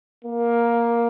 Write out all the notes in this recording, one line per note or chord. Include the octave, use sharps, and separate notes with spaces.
A#3